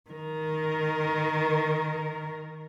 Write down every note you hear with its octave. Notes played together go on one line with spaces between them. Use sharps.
D#3 A#4